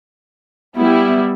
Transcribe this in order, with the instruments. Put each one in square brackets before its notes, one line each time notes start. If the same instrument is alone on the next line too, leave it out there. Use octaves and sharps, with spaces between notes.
[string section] G3 E4 [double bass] B3